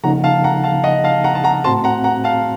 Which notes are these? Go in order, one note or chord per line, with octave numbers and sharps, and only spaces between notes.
C#3 F3 A#3 D#4 F#5 A#5
F5 A5
F#5 A#5
F5 A5
D#5 F#5
F5 A5
F#5 A#5
A5
F#5 A#5
A2 A3 C4 F#4 C5 A5 C6
F#5 A#5
F#5 A#5
F5 A5